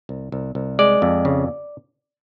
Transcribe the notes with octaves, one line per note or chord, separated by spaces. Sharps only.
C2
C2
C2
G#3 D5
F2
C#3